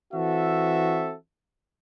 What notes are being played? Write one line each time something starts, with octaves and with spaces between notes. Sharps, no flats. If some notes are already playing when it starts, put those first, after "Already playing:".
E3 C4 F#4 A4 E5